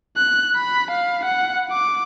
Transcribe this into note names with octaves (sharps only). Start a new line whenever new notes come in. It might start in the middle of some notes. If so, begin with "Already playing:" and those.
F#6
B5
F5
F#5
D6